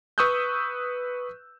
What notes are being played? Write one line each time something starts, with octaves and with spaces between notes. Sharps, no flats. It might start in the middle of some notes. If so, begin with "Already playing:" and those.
B4 C#6 D#6 E6 F#6 G6